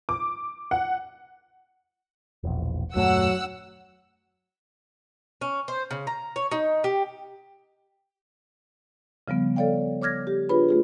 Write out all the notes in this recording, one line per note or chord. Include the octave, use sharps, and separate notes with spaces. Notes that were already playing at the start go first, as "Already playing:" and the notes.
D6
F#5
E1 A#1
D#1 F#2 F#3 A3 F#5 E6
C#4
C5
C#3
A#5
C#5
D#4
G4
C#3 F3 G3 B3
A4 C#5 D5 F5 G5
C#5 D6 F6 G#6 A#6
G4
D4 F4 G#4 B4 C#5 B5
A3 F4 G#4